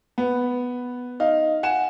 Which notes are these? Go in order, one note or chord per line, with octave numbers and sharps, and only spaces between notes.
B3
D#4 F5
F#5 G#5 E7